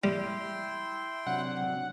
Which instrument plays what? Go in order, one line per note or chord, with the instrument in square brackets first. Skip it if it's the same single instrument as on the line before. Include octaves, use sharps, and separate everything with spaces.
[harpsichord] G3 [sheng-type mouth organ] E4 G5 C6
[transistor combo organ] C3 F#3 D4 [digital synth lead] F#5